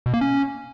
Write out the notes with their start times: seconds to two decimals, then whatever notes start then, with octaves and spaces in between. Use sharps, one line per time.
0.06 B2
0.14 A#3
0.21 C#4